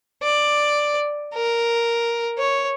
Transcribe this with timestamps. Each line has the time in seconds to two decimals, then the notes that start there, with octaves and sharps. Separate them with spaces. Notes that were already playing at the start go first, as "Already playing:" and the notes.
0.23 D5
1.35 A#4
2.39 C#5